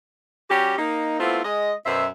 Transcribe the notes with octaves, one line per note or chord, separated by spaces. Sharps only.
G3 C#4 F#4 G4
A#3 D#4
A3 B3 C4 E4 F4
G#3 D#5
F#2 B2 C5 E5